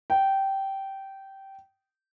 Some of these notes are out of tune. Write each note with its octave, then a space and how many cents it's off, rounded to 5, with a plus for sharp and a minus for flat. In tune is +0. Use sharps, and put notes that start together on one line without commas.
G5 -15